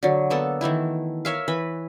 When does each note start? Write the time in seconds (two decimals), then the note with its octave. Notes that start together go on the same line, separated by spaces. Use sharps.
0.03 D3 F#3
0.30 A#3 B3 A4
0.61 D#3 E3 A3 E4
1.25 A#4 C#5 E5 F5
1.48 E3 B4 B5